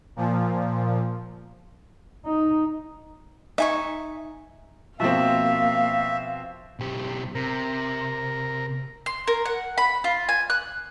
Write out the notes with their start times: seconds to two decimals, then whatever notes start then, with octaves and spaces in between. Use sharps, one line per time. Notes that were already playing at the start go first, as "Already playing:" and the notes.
0.16 A#2 F3
2.25 D#4
3.58 D#4 E5 G#5 C#6
5.00 B2 F3 A#3 C4 E5 F5
6.79 B1 G4
7.35 C3 A#4
9.06 C6
9.28 A#4
9.46 F#5
9.78 B5
10.04 F4
10.29 G#5
10.50 F#6